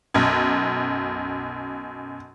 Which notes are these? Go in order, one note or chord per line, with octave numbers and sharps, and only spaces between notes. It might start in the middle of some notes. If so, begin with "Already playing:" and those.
B1 F#2